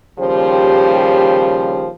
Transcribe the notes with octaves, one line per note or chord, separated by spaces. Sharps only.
D#2 C#3 F3 G3 G4 C5